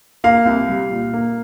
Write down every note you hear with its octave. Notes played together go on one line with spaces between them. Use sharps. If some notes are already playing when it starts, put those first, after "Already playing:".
A#3 F5
C2
G3
A#2
A#3